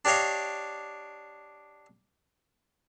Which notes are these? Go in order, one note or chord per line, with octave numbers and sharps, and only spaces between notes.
D4 G4 C#5 D#5 F5